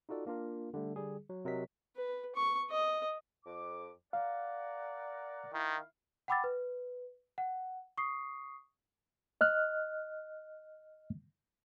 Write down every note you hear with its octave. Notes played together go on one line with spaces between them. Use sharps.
D#4 F4 F#4 A4 D5
A#3 D4 F4 A#4
D3 G3 A3
D3 G3 G#4
F#3
C3 F#3 A#4 D#5 B6
B4
C#6
D#5
F2 D6
A#4 D5 F5 F#5
D#3 E4 F5
F#5 G5 B5 D6 E6 A6
B4
F#5
C#6 D#6 C7
D#5 F6 F#6